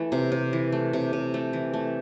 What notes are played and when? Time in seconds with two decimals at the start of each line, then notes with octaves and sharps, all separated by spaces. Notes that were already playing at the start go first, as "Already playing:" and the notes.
Already playing: E3 A3
0.12 C3
0.32 C3
0.53 E3
0.72 A3
0.93 C3
1.13 C3
1.34 A3
1.53 E3
1.73 A3